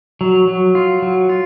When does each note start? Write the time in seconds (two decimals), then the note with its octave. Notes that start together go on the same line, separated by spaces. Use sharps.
0.21 F#3
0.48 F#3
0.75 F4
1.02 F#3
1.29 F4